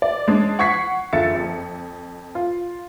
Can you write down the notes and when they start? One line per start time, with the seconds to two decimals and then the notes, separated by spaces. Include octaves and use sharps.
0.02 D5
0.28 G#3 C#4 D4
0.59 F#5 C#6 G#6 B6 C7
1.13 F#1 D3 F4 E5 A6 C#7
1.35 F2
2.35 F4